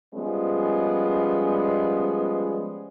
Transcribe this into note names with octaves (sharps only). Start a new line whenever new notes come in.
F3 G3 G#3 B3 C#4